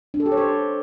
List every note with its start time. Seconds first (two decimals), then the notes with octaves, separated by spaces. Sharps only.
0.14 D4
0.20 A4
0.26 G4
0.32 C#5
0.37 C5